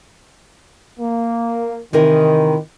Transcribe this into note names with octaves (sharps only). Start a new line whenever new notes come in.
A#3
C3 D#3 E3 A#4